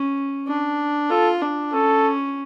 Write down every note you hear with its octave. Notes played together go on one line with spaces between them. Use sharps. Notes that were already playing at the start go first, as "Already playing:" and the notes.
Already playing: C#4
D4
F4 A4
D4
C#4 A4